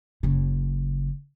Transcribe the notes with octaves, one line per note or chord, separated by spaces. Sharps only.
F#1 C#3